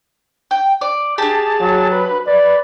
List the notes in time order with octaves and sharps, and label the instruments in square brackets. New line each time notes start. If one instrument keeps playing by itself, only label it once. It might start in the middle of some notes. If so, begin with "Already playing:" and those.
[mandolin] G5
D5
[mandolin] D4 G4 [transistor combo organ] G#4 A5
[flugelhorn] F#3
[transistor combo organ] B4
[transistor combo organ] B4 [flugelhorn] D5